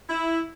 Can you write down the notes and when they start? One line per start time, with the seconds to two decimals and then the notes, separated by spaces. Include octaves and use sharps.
0.09 E4